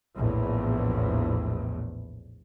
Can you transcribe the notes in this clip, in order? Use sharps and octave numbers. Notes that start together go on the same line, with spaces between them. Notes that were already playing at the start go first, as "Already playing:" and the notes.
A#1 E2 A2